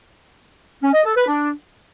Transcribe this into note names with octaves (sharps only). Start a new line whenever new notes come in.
C#4
D#5
A4
B4
D4